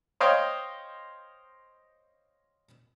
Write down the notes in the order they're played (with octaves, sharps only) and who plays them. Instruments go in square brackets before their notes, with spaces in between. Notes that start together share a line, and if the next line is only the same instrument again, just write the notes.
[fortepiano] C5 C#5 D#5 F5 G5